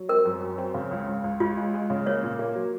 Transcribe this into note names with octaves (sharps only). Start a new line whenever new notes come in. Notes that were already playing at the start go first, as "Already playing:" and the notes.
Already playing: F#3
C4 A#4
F#2
F#2
C4
C#3
C#2
C#2
C#2
C#2 F4
G#3
G#3
C#3
A#3 C#5
A#2
A#3
F#3